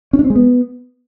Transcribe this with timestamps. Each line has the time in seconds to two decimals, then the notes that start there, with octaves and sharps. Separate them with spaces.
0.13 C#4
0.19 D4
0.24 C4
0.30 G#3
0.36 B3